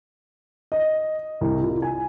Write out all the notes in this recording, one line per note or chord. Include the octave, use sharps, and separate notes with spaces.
D#5
C2
F4
G#5